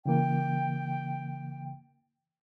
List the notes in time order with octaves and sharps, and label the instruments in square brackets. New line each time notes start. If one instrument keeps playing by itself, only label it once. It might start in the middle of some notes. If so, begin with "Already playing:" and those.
[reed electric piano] C#3 E3 A#3 [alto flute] G5